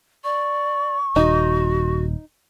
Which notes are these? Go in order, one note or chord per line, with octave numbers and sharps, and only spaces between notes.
D5 C#6
D#1 D#4 F#4